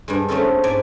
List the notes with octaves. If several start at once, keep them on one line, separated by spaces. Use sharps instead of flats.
G2 G3 G#3
A3 C4 C#4 D#4 F4 A4
G#2 D5 G#5